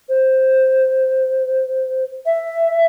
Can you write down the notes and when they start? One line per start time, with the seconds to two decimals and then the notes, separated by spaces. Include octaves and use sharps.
0.09 C5
2.26 E5